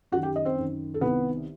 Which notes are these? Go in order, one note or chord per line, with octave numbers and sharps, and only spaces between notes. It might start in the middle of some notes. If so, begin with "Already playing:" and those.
F#2 D#3 F#4 F#5
G4 G5
D#5
C4 C5
F#2 D#3
A4
C2 C3 D#3 B3 B4